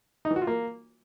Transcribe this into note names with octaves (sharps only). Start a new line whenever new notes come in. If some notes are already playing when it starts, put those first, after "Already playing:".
D#4
E3
F#4
F4
A#3